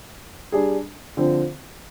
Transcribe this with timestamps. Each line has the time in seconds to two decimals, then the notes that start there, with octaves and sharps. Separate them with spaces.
0.52 G3 D4 G#4
1.17 D3 F3 C4